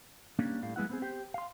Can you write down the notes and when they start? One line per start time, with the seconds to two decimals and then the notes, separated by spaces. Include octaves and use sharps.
0.39 G3 A#3 C#4 D4
0.63 A2 G3 F5
0.76 F#3 G#3 B3 E4 F#5
0.89 B3 C4 G#4
1.02 G4 C5 G5
1.34 F5 C6